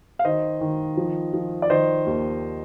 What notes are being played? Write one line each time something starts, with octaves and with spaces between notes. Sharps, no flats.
F5
D#3 C5 D#5
D#3
F3
F3
D5
D#3 C5 D#5
D#2